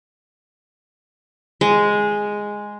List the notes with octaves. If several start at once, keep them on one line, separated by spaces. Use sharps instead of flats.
G#3